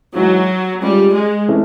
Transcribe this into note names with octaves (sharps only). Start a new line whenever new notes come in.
G#2 E3 F#3 G#3
G3 G#3 C#4 F4
G#3
C3 E3 A3 C#4